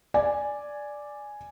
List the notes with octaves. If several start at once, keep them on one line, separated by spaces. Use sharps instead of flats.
D5 G#5